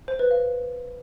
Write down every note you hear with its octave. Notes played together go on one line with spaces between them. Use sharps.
C5
B4
F5